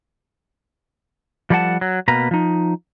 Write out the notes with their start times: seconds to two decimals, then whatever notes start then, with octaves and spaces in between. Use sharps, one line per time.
1.50 F3 G3 A4 D5 F#5 A5
1.81 F#3
2.08 B2 A#3 B4 A#5
2.31 F3 D#4